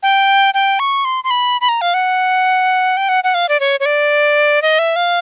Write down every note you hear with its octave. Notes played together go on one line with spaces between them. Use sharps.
G5
G5
C#6
C6
C6
B5
B5
A#5
F5
F#5
G5
F#5
F#5
F5
D5
C#5
C#5
D5
D#5
E5
F5